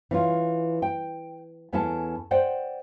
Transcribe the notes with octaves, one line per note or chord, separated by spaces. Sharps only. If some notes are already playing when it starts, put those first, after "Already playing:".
E3 C#4 F4
G5
E2 C#4 E4 A4 A5
C5 D5 F#5 G5